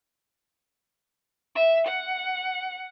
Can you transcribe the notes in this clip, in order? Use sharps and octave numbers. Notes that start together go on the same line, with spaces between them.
E5
F#5